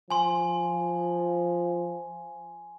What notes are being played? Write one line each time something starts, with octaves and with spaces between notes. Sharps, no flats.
F3 G#5 C6